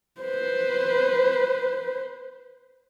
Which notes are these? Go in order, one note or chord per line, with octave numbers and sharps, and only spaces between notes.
B4 C5